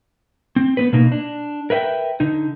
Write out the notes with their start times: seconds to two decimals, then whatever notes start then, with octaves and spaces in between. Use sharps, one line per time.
0.56 C4
0.77 B3 C4 B4
0.93 B2 A#3 D#4
1.12 D4
1.70 A#4 B4 E5 F#5 G5
2.20 D3 D#4